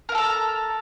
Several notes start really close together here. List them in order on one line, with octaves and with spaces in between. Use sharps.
A#4 F5 A4 A#5